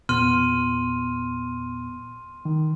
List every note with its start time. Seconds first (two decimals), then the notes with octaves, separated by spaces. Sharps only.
0.09 E2 A#2 B3 C6 F6 D#7
2.45 D#3